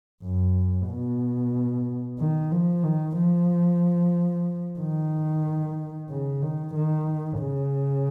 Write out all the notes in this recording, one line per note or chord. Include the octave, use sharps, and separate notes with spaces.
F#2
B2
D#3
F3
D#3
F3
D#3
C#3
D#3
D#3
C#3